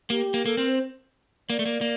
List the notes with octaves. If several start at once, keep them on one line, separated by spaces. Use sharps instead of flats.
A#3 G4
A#3
A#3 A4
C4 A#4
C5
A#3 D5
A3
A#3
A#3